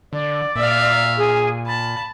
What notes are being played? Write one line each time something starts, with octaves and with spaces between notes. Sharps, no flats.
D3 D5
A#2 E5 F5
G#4
A5 B5